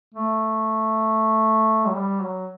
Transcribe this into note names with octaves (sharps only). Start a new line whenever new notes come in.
A3
F#3
G3
F#3